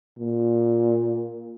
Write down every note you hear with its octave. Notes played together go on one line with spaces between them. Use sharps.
A#2